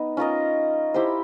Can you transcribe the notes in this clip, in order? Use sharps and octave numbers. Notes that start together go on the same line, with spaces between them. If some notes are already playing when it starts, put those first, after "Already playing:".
Already playing: B3 D#4
C#4 F4 A#4 D#5
E4 G4 C5